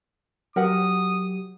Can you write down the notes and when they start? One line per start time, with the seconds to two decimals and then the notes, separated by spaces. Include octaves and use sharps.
0.56 F#3 G4 A#4 F#5 D#6